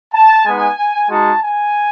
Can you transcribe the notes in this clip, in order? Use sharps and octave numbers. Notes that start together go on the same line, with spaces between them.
A5
G#3 B3 D#4 G#5
G#3 D#4 F#4 A5
G#5